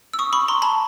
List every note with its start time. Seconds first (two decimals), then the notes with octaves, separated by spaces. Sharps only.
0.13 E6
0.19 C#6 D#6
0.33 B5 C#6
0.48 A#5 C6
0.62 A5 B5